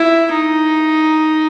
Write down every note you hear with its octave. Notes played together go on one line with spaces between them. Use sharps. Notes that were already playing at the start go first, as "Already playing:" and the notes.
Already playing: E4
D#4